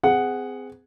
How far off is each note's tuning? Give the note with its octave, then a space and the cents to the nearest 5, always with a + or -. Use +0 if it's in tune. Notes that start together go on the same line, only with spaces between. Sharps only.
C4 -35 G#4 -5 F#5 +0